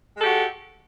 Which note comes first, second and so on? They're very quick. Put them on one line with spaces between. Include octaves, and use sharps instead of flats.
G#3 A4 G4 F#4